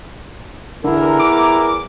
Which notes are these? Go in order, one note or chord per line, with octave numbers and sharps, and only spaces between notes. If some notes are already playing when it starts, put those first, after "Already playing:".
E2 D3 E4 A#4
D6